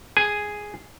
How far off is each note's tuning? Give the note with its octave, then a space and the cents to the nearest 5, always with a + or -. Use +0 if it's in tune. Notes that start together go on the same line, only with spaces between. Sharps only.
G#4 +0 G#5 +0